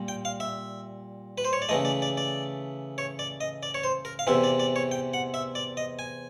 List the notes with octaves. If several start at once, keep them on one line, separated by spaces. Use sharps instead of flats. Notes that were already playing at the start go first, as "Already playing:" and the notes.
Already playing: A#2 G3
G5
F5
E5
B4
C5
C#5
D5
C#3 E3 A3 D#5
D5
D5
D5
C#5
D5
D#5
D5
C#5
C5
A#4
F5
E2 C3 E3 E5
D5
D5
C#5
G5
F#5
E5
D5
D#5
G#5